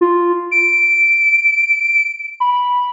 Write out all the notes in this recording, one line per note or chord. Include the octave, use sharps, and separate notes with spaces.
F4
D7
B5